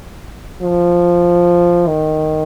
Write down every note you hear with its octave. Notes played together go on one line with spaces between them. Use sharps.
F3
D#3